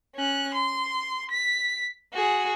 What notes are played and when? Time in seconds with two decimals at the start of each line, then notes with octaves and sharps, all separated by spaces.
0.15 C#4 F#6
0.54 C6
1.31 B6
2.14 F#4 G#4